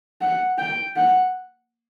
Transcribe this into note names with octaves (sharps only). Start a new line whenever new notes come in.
F#5
G5
F#5